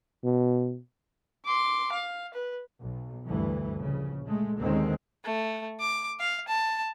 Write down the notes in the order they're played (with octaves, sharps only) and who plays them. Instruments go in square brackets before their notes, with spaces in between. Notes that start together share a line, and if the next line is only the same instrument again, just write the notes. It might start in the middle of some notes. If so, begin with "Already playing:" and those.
[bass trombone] B2
[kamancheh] C6 D6
F5
B4
[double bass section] B1
D2 G2 E3
A#1 C#3
G#3 A3
D#2 D3 D#3 G#3 C4 C#4
[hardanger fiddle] A3
D6
F5
A5